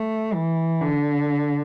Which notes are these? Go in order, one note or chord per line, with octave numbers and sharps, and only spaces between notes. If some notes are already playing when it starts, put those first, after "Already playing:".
Already playing: A3
E3
D3